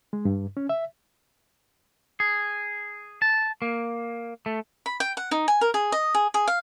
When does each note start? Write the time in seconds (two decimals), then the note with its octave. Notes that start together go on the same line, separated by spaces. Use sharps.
0.13 G#3
0.25 G2
0.57 C#4
0.69 E5
2.20 G#4
3.22 A5
3.62 A#3
4.46 A3
4.86 B5
5.00 G5
5.17 F#5
5.31 D#4
5.48 G#5
5.61 A#4
5.74 G#4
5.92 D#5
6.15 G#4
6.34 G#4
6.48 F5